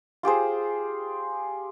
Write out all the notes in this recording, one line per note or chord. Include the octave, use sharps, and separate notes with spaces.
F4 G4 G#4 C5